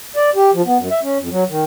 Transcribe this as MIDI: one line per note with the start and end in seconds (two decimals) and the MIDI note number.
0.16 0.30 74
0.35 0.51 67
0.54 0.62 53
0.66 0.78 59
0.78 0.89 42
0.91 1.00 76
1.03 1.18 61
1.20 1.29 41
1.31 1.44 54
1.49 1.64 51